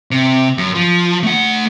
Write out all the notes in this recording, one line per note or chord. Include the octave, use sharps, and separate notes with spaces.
C3
F#2
F3
A3 F#5